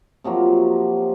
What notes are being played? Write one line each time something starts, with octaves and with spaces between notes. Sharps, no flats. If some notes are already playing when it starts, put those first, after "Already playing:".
C3 F3 F#3 A#3